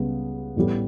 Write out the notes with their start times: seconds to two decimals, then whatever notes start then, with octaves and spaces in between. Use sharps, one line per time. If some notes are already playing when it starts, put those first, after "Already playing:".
Already playing: C#2 C#3 G3 B3
0.56 A1 A2 G3 B3